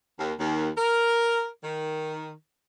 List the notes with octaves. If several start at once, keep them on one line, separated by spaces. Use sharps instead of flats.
D#2
D#2
A#4
D#3